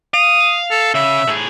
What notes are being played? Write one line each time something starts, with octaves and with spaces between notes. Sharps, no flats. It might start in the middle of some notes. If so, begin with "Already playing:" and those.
F5 D#6
A4
C#3 E5
A2 G#4